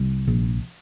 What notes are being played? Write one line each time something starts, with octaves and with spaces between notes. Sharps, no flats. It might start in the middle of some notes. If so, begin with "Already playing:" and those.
Already playing: C2 G3
A#1